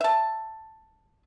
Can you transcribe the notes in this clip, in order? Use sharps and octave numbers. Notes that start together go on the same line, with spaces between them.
E5 A5